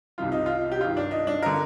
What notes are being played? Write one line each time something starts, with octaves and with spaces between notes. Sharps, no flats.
C2 C3 D#3 F4
D#4
F4
G4
G2 D#3 F4
D4
D#4
D4
D3 A#4